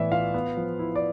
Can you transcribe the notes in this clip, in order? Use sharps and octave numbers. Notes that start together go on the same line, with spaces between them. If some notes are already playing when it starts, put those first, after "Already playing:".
Already playing: A2 E3 B3 D5 E5
F4 F5
B3
F3
E4
D5